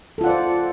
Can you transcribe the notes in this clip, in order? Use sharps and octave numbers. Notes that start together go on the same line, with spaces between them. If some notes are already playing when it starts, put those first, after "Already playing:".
F4 A4 C5 D5 F#5